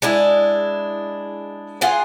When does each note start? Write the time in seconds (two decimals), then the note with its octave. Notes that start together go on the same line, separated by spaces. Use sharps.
0.02 G#3 D4 E4
1.81 F4 G#4 F#5